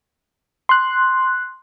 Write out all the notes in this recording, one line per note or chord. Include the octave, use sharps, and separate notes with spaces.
C6 F#6